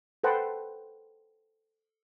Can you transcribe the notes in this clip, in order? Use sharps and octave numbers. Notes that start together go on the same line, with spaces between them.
A4 B4 C5 F#5 G5 A5